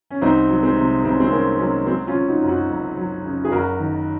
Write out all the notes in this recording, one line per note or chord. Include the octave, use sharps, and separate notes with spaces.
C#4
C2 C4 D#4
F#3
G#3 C4
C3
C2 C4
C#4
G#3 C4
C2 A#3 C#4
F#3 A#3 C#4
F#3 G#3 C4
C#4 F4
C#3
D#4 F#4
F#2
D#4 F#4
F#1
F#3
C#3
G#4
F#1 F#4 A#4
D#3